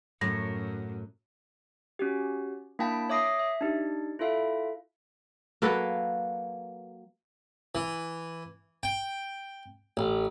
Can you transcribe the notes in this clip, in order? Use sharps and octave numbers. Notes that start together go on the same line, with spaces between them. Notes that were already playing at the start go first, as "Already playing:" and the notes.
F#2 A2 F#3 A#6
C#4 F#4 G4
A#3 D4 E4 G5 A5 B6
C#5 E5 D6 D#6 A#6 C7
E5
D4 D#4 G4
E4 F4 A4 E5 F5
F#3 A#3 A4 B4
E3
G5
A1